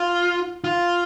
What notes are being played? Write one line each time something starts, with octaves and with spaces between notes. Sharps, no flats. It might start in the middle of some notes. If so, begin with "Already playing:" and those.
Already playing: F4
F4